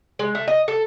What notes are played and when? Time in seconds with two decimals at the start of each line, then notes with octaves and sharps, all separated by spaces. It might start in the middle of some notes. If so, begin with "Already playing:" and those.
0.19 G#3
0.35 A3
0.48 D#5
0.68 A4